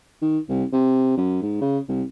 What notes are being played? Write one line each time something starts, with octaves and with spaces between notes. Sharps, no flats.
D#3
C2
C3
F#2
G#2
C#3
C2